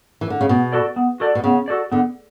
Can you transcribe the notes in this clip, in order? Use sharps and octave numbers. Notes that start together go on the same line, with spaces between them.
E3
D3
C#3
B2 B3
F#4 A4 D5
B3
F#4 A4 D5
B2
C#3 B3
F#4 A4 D5
D3 B3